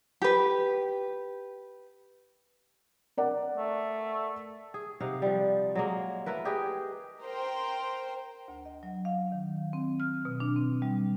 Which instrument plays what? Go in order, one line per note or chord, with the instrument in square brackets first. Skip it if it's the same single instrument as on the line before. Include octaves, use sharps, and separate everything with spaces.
[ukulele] G4 B4
[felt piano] A#4 D5 F#5
[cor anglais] A3
[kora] G#4
C3 D#4 F5 F#5
F3 G3
F#3 G#3 A#3
A3 E4 A#4 B4
G4 G#4 B4 D#5
[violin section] A#4 C5 G5
[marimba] D2
D#5
F#3
F5
D#3
C4
F6
B2
D4
C4
G3